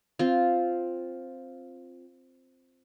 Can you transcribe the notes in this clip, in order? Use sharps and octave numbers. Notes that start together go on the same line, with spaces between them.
C4 F4